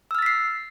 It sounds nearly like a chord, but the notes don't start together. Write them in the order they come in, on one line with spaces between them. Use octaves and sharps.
E6 F6 A6 B6 C7